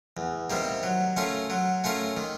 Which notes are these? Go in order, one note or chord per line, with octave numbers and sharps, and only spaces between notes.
E2
C3 D#3 G3 A#3
F#3
A3 C#4 F4 A#4
F#3
A3 C#4 F4 A#4
D#3